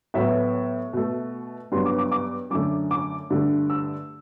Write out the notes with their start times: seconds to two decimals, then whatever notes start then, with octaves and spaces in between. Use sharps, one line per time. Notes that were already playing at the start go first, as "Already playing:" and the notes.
0.14 A2 F#3 B3 E5
0.93 B2 A3
1.72 G2 F#3 B3 C6
1.86 D6
1.98 D6
2.12 D6
2.50 F#2 D3 A3 D6
2.91 D6
3.30 G2 D3 A3
3.70 E6